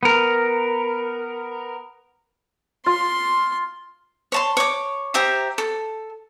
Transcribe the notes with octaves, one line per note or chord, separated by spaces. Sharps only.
B3 A#4
F4 C6
C#5 A5 C6
C#5 D6
G4 C5 E5 A#5
A4